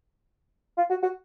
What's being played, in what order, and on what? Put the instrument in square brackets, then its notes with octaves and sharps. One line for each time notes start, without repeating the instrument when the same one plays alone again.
[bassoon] F4
F#4
F#4